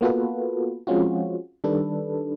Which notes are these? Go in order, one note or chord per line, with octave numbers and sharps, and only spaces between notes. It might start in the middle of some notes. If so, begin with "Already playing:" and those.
A#3 B3 F4 F#4 A4 B4
F3 G#3 C4 C#4 F4 F#4
D#3 G3 D4 A4 B4